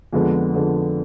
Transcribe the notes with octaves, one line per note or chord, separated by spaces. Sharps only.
F2 D3 G#3 B3
F2 D3 G#3 B3